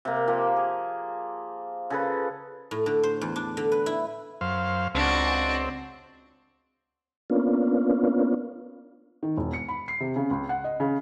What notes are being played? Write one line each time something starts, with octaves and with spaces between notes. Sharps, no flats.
C3 A#3
F3 A#3 G4
G#4
C#3 A4 B4
A2
D3
C5
E2
D4
D3
B4
E4
F#2 C5 F5
C#2 C4 D4 F#4
A#3 B3 C#4 D4 F4
D#3
E1
C#7
B5
C7
C3
C#3
C#2
F#5
D#5
C#3